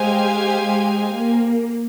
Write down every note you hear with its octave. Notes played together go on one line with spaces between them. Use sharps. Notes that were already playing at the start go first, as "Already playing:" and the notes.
Already playing: G#3 G4 C5 F5 G#5
G#3
A#3